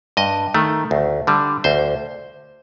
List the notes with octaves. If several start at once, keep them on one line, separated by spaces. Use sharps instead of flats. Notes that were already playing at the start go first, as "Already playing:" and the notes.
G2 D#5
D#3 A3
D2
D3 G3
D2 C5